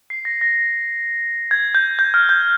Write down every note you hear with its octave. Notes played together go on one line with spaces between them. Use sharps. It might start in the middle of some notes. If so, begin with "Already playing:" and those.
C7
A#6
A#6
G#6
G6
G6
F6
G6